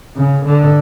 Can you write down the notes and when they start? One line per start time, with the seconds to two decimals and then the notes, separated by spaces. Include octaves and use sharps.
0.16 C#3
0.45 D3